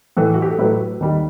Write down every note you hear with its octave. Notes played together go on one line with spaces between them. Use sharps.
A2 E3 A3 A4
F#4
G4
A4
A2 F#3 A3 B4
D#2 D#3 G3